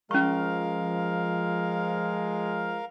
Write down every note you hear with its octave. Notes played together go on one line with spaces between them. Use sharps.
F3 G#3 C#4 A#4 F5 C#6